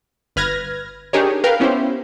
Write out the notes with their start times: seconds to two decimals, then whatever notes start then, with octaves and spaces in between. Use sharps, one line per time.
0.36 G1 B4 F6 G#6 A#6
1.13 D4 D#4 G4 G#4 A#4 C#5
1.44 A#4 B4 F5 G5
1.60 B3 C#4 E4 G4 C5